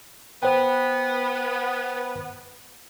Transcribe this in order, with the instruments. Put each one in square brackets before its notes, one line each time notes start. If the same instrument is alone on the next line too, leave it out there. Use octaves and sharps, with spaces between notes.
[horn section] B3 [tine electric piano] C5 G5